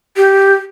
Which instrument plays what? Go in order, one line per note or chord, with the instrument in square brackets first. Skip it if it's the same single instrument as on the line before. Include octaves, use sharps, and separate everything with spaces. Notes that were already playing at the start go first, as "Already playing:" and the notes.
[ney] G4